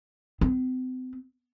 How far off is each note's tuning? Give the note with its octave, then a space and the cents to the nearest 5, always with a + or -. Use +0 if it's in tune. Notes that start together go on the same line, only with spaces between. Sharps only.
C4 -40